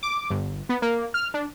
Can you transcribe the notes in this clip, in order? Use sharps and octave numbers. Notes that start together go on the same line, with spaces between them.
D6
G1
B3
A#3
F6
D4